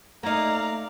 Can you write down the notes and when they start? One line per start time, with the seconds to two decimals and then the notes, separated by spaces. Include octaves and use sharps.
0.23 A3 A#3 D#4 D5 F5 A#5